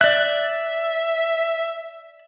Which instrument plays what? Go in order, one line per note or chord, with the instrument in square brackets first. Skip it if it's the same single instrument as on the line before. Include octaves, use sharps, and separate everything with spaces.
[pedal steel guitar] D5 F#6 [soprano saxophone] E5